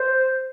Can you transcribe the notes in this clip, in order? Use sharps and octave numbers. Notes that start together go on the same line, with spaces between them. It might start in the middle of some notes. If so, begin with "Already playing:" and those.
Already playing: C5